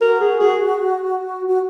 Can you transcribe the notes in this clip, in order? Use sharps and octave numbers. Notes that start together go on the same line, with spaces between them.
F#4 A#4
G#4
G#4
F#4